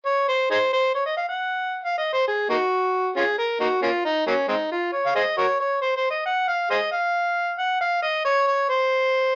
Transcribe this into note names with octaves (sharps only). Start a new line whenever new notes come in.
C#5
C5
D#4 G#4 C5
C5
C#5
D#5
F5
F#5
F5
D#5
C5
G#4
A#3 D#4 F#4
C#4 F4 G#4
A#4
A#3 D#4 F#4
A#3 C#4 F4
D#4
F#3 A#3 C#4
G#3 C4 D#4
F4
C#5
F5
G#4 C5 D#5
F#4 A#4 C#5
C#5
C5
C5
D#5
F#5
F5
G#4 C5 D#5
F5
F#5
F5
D#5
C#5
C#5
C5